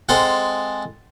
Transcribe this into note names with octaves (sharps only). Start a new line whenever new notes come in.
G#3 C4 A4 F5 F#5